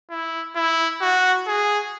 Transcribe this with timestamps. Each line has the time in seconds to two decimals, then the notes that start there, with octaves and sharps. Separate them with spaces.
0.10 E4
0.56 E4
1.01 F#4
1.47 G#4